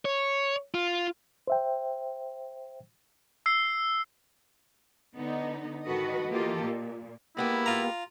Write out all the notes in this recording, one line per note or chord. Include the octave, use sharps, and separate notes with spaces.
C#5
F4
C5 E5 G5
E6 C7
D3 B3 D#4
G#2 D#3 F#4 A4 B4 D#5
E3 A#3 F4 G4 A4 D#5
A#2
G#3 A#3 B3 E4 G4
F4 A#5